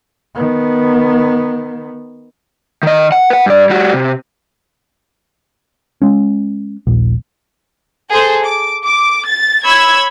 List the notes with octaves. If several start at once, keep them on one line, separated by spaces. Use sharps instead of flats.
D#3 B3
D#3 D#5
F#5
B4 F#5
G2 D5
G3 F#4
C3
G#3 C#4
D#1 A#1
G#4 A4 C5
D6
D6
A6
C#5 B5 E6 G#6